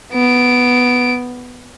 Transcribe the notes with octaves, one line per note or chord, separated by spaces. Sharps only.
B3 D7